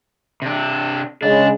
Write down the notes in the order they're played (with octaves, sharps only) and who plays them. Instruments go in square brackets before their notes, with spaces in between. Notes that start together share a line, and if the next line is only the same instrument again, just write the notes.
[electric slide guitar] C3 D4
[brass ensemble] C#3 G#3 [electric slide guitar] D4